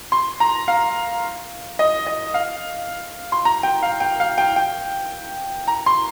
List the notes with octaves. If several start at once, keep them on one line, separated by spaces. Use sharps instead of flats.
C6
A#5
F5
D#5
D#5
F5
C6
A#5
G5
F5
G5
F5
G5
G5
A#5
C6